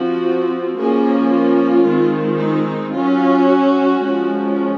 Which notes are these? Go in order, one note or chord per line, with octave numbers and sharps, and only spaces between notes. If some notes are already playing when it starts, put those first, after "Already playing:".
Already playing: F3 C4 F#4
F3 A#3 C#4 G#4
F4
D#3 G#3 C4
D#4
F#3 C#4 F4
F#4
F3 G#3 C#4